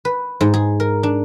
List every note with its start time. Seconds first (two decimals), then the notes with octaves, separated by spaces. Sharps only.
0.05 B4
0.41 G#2
0.54 G#4
0.80 A#4
1.03 D4